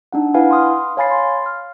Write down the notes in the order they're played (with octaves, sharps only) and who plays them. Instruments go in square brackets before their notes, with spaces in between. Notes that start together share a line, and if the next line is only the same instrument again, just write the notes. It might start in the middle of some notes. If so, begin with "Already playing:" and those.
[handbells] D4 D#4 F#5
E4 B4 F5 F#5 G#5
C6 D#6 F6
C#5 F5 G#5 B5 A6 C7
C6
F6